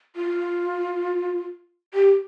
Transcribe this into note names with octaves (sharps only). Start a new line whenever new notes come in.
F4
G4